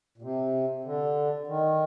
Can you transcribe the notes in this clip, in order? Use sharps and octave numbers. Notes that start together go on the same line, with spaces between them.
A#2
C3
D3
D#3